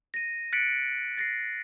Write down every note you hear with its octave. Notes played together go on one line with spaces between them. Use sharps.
A#6 D#7
F#6 A6 B6 C#7 D7 F#7
A6 A#6 C7